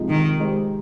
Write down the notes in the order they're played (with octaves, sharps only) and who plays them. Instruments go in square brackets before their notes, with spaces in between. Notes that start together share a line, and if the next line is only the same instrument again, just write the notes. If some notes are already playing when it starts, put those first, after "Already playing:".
Already playing: [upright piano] C3 F3 G#3 D#4
[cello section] D#3
[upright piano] G#3 D#4 G4 C5